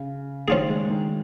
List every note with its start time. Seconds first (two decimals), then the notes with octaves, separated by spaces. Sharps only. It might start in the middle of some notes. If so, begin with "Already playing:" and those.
Already playing: C#3
0.48 D#3 F3 C#4 F4 G#4
0.69 G#3
0.90 D#3